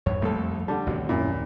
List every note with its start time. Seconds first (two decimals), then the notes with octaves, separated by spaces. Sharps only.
0.06 E2 G2 C#5
0.22 C2 F2 A3 A#3 A4
0.68 D3 G3 A5
0.87 A1 D#2 C3 F#4
1.09 F#2 A#2 C#4 E4